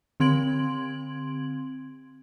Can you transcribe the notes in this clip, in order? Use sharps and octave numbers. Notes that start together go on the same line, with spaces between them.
D3 C4 C6 G#6 D7 F#7